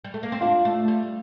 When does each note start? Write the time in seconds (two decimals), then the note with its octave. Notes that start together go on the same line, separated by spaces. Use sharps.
0.04 G3
0.14 A3
0.23 A#3
0.32 C4
0.41 D4 F4
0.65 A3
0.88 G3